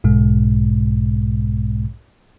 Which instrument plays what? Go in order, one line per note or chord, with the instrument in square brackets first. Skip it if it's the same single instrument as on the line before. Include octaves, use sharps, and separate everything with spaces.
[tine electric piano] B1 G#2 B2 G#3